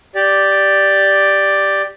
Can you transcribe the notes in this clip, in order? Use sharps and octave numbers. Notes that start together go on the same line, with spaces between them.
G4 D5